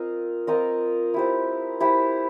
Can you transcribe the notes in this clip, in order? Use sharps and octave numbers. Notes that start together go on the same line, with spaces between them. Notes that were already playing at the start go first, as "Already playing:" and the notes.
Already playing: C4 F4 A#4 D#5
C4 F4 A#4 D#5
E4 G4 C5
E4 G4 C5